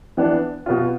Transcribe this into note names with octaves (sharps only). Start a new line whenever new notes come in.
E3 B3 D4
B2 B3 F4